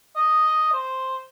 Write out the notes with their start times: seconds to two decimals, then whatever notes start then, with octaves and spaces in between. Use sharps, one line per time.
0.16 D#5
0.73 C5